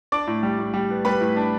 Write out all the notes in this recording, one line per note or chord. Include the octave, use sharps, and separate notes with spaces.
D4 D5 D6
A2
G3
A2
G3
B3
G3 B4 B5
A2
D4